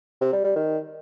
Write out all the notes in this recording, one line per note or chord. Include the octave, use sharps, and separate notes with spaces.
C3
G3
G3
D#3